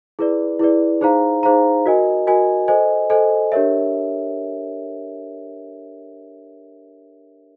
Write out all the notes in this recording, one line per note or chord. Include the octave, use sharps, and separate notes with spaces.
E4 G#4 B4 D5
E4 G#4 B4 D5
D#4 G#4 C5 F5 A#5
D#4 G#4 C5 F5 A#5
F#4 A#4 D#5 G#5
F#4 A#4 D#5 G#5
A4 C5 D#5 G#5
A4 C5 D#5 G#5
D4 G4 A#4 C#5 E5